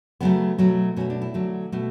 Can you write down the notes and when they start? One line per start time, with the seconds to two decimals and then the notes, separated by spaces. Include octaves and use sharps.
0.20 C#3 F#3 A3 B3
0.58 B2 F#3 A3
0.96 B2 A3 C#4
1.10 D4
1.22 E4
1.34 D3 F#3 A3
1.72 B2 A3